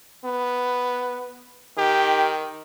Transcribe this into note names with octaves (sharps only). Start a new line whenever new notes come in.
B3
D#3 G4